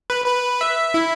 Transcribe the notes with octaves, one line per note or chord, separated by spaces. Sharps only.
B4
B4
E5
E4